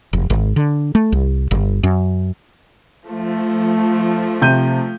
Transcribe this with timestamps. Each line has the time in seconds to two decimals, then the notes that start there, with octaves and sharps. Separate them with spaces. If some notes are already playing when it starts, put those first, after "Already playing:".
0.13 F1
0.30 G#1
0.56 D3
0.95 A3
1.12 C2
1.51 G1
1.83 F#2
3.06 F3 A3
4.42 C3 G6 D#7